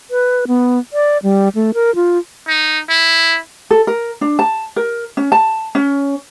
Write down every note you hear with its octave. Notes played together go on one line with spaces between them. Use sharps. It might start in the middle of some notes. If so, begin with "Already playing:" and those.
B4
B3
D5
G3
A3
A#4
F4
D#4
E4
A4
A#4
D4
A5
A#4
C#4
A5
C#4